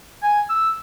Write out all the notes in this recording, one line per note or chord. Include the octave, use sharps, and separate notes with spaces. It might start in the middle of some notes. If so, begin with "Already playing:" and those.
G#5
E6